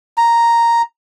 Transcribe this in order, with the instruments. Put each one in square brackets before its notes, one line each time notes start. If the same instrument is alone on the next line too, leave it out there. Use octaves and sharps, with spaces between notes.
[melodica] A#5